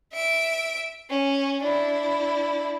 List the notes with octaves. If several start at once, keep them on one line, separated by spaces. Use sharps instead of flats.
E5 D7
C#4
D4 E4